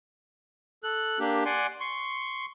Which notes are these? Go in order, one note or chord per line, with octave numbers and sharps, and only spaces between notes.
A4 F#6
A#3 D4 G4
D5 F#5 G#5 C6
C6 C#6